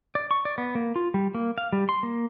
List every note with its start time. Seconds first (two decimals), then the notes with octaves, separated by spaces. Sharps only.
0.15 D5
0.31 C#6
0.45 D5
0.58 B3
0.75 A#3
0.96 F4
1.14 G3
1.35 A#3
1.58 F5
1.73 G3
1.89 C6
2.03 A#3